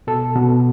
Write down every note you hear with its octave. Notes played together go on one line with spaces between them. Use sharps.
B2 A4
B2